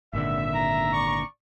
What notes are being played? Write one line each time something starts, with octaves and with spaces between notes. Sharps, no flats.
G#1 A#2 D3 E5
A#5
D5 C#6